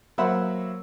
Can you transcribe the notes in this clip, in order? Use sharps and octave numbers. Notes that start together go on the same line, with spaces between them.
F#3 A#3 C5 E5 F#5 B5